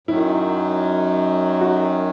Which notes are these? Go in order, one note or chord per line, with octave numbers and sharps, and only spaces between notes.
F#2 D#3 F#3 E4
F#4